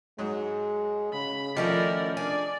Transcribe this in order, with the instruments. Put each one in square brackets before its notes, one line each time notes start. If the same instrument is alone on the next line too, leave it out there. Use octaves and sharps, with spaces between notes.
[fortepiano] G#2 F#3 [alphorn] G#3
[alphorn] C#3 [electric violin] B5
[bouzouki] D#3 C#4 E4 [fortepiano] F3 [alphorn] A3 [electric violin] A#4 D5
[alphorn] D4 [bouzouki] G#4 [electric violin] D5